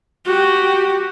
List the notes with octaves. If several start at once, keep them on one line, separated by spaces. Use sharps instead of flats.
F#4 G4